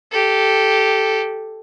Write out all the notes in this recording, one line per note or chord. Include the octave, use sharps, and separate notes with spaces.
G4 A4